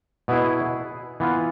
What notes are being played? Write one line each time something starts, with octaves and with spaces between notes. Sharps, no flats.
B2 B3 E4 G#4
E3 B3 F4